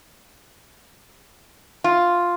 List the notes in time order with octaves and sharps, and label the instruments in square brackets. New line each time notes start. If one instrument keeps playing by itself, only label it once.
[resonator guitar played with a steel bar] F4